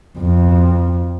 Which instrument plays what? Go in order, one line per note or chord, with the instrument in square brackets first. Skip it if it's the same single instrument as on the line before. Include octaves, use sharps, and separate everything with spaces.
[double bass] F2